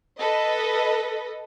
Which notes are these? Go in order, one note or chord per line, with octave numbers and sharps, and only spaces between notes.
A4 B4 D#5